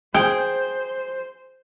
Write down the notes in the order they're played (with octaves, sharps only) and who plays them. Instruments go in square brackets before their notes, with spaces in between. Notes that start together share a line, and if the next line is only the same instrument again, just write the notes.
[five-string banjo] G#4 [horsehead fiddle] C5 [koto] G5